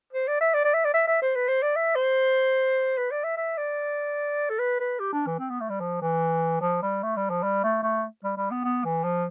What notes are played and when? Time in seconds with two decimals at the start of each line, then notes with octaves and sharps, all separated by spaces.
0.13 C5
0.27 D5
0.41 E5
0.54 D5
0.64 D5
0.74 E5
0.85 D5
0.94 E5
1.07 E5
1.22 C5
1.35 B4
1.48 C5
1.62 D5
1.76 E5
1.95 C5
2.98 B4
3.11 D5
3.24 E5
3.37 E5
3.57 D5
4.50 A4
4.59 B4
4.80 B4
4.99 G4
5.13 D4
5.27 E3
5.39 C4
5.50 B3
5.60 A3
5.70 G3
5.80 F3
6.02 E3
6.61 F3
6.82 G3
7.03 A3
7.16 G3
7.30 F3
7.43 G3
7.64 A3
7.83 A3
8.24 G3
8.37 G3
8.51 B3
8.64 B3
8.85 E3
9.04 F3